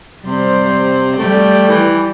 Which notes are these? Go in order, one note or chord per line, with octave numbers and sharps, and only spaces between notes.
C3 G3 C5
G3 A3 G5
E3